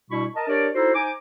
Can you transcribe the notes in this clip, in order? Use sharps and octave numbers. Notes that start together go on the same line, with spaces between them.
B2 G3 D4 E4 B5 C#6
A#4 D#5 A5
D4 G4 A#4 C#5 D5
D#4 E4 F#4 A4 C5
D#4 C5 G#5 A#5 D6